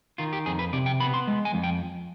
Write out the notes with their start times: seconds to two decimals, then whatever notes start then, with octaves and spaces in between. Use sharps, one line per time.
0.18 D#3 F4
0.33 G4
0.46 F2 G#4
0.59 B4
0.73 C3 D5
0.86 G5
1.00 B3 B5
1.14 C6
1.27 G#3
1.45 G#5
1.54 F2
1.63 G5